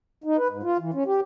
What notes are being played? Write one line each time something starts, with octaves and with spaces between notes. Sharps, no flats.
D#4
B4
G#2
F4
E3
C#4
G4